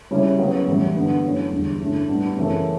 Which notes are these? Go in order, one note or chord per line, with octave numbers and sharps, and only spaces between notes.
C#3 G3 C#4 E4
C#3 F#3 B3
A2 E3 G3 B3
G2 D3 G3 B3
G2 F#3 A3 C#4 E4
E2 D3 G3
G2 D3 A3 C#4 E4
A2 G3 B3 D4
F#2 C#3 E3 A3 C#4